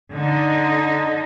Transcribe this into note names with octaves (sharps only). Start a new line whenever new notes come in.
D3 D#4